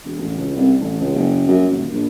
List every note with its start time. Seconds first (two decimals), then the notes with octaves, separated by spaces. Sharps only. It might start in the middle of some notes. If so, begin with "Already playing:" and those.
0.05 E1
0.19 A1
0.37 C#2
0.56 C2
0.80 A1
1.00 C#2
1.15 F#1
1.47 F#2
1.71 D#1
1.92 A#1